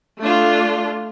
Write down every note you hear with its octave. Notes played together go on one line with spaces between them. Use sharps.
A3 D4 F4